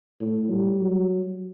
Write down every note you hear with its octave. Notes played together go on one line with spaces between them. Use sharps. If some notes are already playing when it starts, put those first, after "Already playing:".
A2
G3
F#3